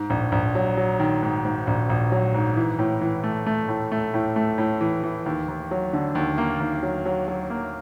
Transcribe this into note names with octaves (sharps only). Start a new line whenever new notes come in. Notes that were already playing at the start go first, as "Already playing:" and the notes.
Already playing: G#2
A#1
A#1
F#3
F#3
D#3
G#2
G#2
A#1
A#1
F#3
G#2
E3
A2
E3
A3
A3
A2
A3
A2
A3
A2
E3
E3
D#2
D#2
F#3
D3
D#2
A#3
D#2
F#3
F#3
F#3
A#3